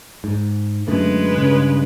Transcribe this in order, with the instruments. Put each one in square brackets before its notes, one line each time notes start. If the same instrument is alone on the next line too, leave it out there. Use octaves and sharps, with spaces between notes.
[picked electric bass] G#2
[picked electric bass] F#2 D3 A3 [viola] G#3 B4
[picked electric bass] G2 C#3